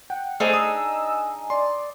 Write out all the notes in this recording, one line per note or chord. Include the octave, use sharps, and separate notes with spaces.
F#5 G5
A3 D4 D#4 G#4 C5 D#5 E6
D#6
D5 C6